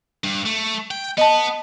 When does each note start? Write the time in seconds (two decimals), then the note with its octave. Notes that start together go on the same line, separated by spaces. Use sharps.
0.24 G2
0.46 A3
0.91 G5
1.18 B3 D#5 A5